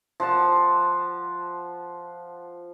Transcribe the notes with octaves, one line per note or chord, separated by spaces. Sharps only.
F3 F#5 A5